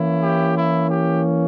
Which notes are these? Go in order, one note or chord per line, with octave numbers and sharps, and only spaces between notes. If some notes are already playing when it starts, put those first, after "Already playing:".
Already playing: E3 A#3 C#4 E4
G4
E4
G4